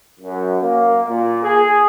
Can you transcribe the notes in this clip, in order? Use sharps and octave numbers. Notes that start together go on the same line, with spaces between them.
F#2
A#3
A#2
G#4